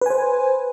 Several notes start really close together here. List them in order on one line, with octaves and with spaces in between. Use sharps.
B4 G#5 C5